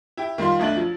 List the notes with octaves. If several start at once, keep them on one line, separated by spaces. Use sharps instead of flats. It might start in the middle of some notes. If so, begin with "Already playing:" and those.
E4 G4
D#3 G3 F4 C6
B1 A3 D4 A6 F#7
F3 F#3